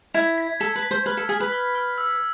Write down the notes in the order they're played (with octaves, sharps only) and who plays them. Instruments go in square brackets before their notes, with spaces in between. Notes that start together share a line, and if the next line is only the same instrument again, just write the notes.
[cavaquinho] E4 [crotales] G#6
[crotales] B6
[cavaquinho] A4 [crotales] B6
[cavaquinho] B4
[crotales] B6
[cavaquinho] C5
[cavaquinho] B4 [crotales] F6
[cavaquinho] A4
[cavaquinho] G#4 [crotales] F6
[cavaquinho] B4
[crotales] F6
F6
E6